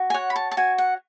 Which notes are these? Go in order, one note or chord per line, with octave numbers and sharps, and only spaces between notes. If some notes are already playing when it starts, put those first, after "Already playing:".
Already playing: F#4
G#5
C#5 F#5
B5
A5
A5
F#4 G#5
F#5